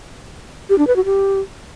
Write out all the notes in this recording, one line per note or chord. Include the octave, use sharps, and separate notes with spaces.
G4
D4
B4
F#4
G4